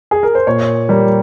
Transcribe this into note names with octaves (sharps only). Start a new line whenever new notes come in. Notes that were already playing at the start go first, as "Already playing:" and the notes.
G#4
A#4
C5
A#2 C#5
G3 A#3